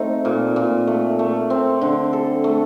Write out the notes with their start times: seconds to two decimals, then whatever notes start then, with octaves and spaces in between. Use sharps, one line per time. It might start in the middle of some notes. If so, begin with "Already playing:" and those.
Already playing: A3 C4 D#4
0.25 A#2
0.56 A#2
0.87 A3
1.19 A3
1.50 C4
1.81 D3
2.13 A4
2.44 A3